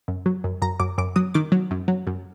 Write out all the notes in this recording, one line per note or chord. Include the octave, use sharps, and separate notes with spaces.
F#2
F#3
F#2
F#2 A#5
F#2 D6
F#2 D6
F#3 D#6
D#3 D6
F#3
F#2
F#3
F#2